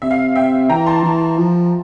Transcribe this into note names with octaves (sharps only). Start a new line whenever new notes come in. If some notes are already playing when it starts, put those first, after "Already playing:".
C3 E5
F5
E5 G5
E3 G5 A#5
A5 C6
E3
F3